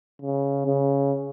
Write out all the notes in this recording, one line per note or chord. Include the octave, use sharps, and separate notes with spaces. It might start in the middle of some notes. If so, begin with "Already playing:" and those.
C#3
C#3